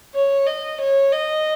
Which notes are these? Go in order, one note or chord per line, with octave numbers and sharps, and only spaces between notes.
C#5
D#5
C#5
D#5